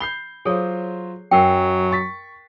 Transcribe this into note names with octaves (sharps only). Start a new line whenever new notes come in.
B5 G6 C7 G7
F#3 F4 G#4 A4 C5 C#5
F#2 F#3 A#4 G5 C7
C#6 A6 B6